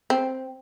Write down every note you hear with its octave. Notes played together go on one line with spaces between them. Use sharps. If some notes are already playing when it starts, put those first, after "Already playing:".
C4